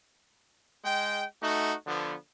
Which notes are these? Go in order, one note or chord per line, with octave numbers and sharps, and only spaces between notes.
G#3 G5
A3 D#4 F#4
D3 F3 B3